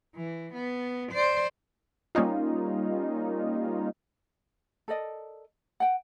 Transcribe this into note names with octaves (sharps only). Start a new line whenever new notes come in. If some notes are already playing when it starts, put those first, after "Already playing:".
E3
B3
C5 D5
G3 A#3 C#4 D#4 F4
A4 A#4 D5 D#5
F#5 G5